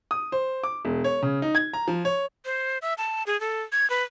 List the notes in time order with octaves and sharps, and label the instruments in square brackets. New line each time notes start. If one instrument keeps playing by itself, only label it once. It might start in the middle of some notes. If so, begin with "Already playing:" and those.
[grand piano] D#6
C5
D6
E1
C#5
C#3
D#4
G#6
A#5
F3
C#5
[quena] C5
E5
A5
G#4
A4
G#6
B4